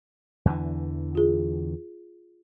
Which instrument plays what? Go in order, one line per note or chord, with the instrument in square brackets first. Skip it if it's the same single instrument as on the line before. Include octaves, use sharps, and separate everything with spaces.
[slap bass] E2 D3 E3
[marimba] F4 G#4